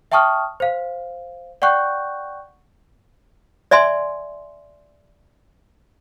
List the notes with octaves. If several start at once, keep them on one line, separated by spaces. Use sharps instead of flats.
E5 G5 A5 C#6 D#6 F6
C5 F5
D5 F#5 G5 C#6 F#6 G6
D5 E5 G#5 C6